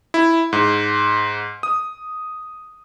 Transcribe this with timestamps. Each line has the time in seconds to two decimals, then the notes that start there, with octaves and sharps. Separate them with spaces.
0.14 E4
0.53 G#2
1.63 D#6